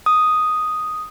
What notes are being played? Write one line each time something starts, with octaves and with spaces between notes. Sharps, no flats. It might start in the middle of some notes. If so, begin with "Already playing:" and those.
D#6